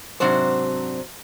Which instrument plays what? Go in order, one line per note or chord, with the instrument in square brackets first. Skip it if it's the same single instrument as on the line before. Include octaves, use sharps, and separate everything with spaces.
[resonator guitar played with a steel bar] G#2 C3 F#3 C4 D4 C5